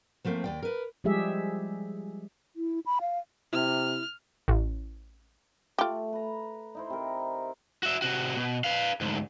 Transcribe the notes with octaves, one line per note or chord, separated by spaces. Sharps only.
F3 A3 A#3 C4
D#2 D5 G5
A#4 B4
F3 G3 G#3 G4 G#4 E5
E4
B5
F5
C3 E4 F6
A1
A3 F4 G4
B4 A#5
D#4 E4 C5
C3 A#4
F#4 E5
C3 F#4
B2
B4 F5
D2 G#2